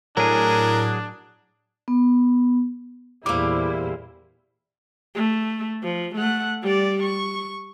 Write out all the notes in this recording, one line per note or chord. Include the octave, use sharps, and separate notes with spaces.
A2 F#3 D4 G#4 A#4
B3
E2 A#2 G3 A#3 E4 G#4 C5 D6
A3
F3
A3 F#5
G3 D5
C#6